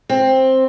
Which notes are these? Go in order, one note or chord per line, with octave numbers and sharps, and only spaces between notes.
C4